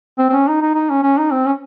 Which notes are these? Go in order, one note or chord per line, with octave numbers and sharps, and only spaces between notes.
C4
C4
C#4
D#4
D#4
D#4
C#4
C#4
D#4
C4
C#4